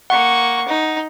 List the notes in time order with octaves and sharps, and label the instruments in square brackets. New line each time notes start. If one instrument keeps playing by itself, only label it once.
[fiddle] A#3 C#6 [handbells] F#5
[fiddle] D#4